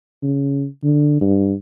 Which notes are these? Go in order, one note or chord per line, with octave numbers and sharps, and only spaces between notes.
C#3
D3
G2